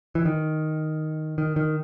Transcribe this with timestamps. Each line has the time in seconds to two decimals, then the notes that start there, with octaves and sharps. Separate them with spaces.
0.15 E3
0.25 D#3
1.38 D#3
1.56 D#3